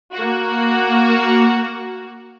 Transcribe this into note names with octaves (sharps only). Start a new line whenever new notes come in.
A#3 F#4